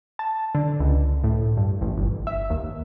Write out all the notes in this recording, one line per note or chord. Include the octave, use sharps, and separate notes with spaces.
A5
D3
C#2
A2
G2
A1
G1
E5
D#2